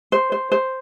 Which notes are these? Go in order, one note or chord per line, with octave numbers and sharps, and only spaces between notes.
C5
C5
C5